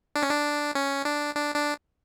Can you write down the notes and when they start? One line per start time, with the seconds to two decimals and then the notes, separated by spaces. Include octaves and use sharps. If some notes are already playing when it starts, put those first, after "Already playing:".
0.16 D4
0.22 C#4
0.30 D4
0.75 C#4
1.05 D4
1.35 D4
1.55 D4